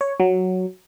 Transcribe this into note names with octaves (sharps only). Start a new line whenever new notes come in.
C#5
F#3